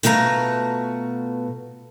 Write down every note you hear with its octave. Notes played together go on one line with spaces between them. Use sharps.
B2 A3 F4 F#4 C#5 A#5